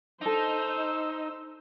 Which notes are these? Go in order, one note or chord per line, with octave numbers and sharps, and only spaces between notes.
D4 D#4 A4 C5 E6